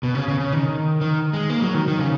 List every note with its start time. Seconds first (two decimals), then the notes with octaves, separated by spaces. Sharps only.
0.03 B2
0.15 C#3
0.28 C#3
0.40 C#3
0.53 D#3
1.01 D#3
1.33 G#3
1.50 A#3
1.62 F#3
1.74 D#3
1.88 D#3
1.99 C#3